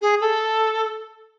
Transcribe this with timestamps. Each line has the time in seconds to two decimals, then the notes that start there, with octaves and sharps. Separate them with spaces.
0.02 G#4
0.21 A4